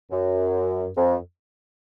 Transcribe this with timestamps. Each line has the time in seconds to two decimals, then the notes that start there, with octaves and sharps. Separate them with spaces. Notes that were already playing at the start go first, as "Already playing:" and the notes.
0.11 F#2
0.96 F2